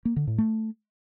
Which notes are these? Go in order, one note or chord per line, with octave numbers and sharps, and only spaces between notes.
A#3
D3
A2
A3